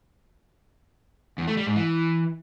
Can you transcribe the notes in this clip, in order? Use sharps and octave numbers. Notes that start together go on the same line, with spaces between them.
E2
A3
G3
G#2
E3